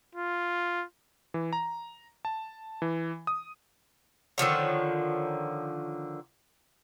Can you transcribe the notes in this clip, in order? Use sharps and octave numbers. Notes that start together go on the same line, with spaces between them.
F4
E3
A#5
A5
E3
D#6
D3 D#3 F3 C#5